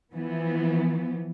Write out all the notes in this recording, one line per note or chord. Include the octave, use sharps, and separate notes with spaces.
E3 F3 B3